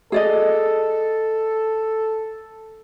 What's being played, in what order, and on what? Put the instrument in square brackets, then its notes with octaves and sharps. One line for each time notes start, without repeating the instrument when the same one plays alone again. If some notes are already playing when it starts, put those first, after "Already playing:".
[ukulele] G#4 D5 D#5 [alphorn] A4